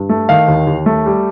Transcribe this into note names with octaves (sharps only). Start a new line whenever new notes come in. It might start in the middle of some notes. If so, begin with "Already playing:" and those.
Already playing: G2
A3
D#3 F5
D#2
D#2
A3
G3